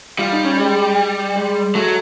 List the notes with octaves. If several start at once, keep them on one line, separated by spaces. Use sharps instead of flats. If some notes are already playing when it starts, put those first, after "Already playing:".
G3 F4
D#4
C#4
G#3
G#3
F#3 A3